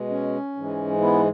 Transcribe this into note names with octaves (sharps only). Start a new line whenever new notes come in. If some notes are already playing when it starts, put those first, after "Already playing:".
Already playing: B2 G#3
C#4
G#2 E3 G#3
B3 E4